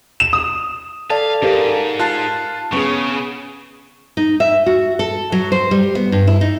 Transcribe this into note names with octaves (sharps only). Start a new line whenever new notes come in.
E7
D#6
A4 D5 F5 A5
G#2 G4 A#4 F5
F4 A5 F#6 C7
C#3 B3 C#4 G#4 C#6
D#4
E5
F#4
A4
F#3
C5
G3
B3
G2
E4
D#4